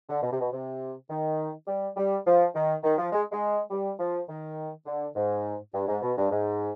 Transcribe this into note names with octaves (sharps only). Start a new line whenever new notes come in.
D3
B2
C3
B2
C3
D#3
G3
G3
F3
D#3
D#3
F3
G#3
G#3
G3
F3
D#3
D3
G#2
G2
G#2
B2
G2
G#2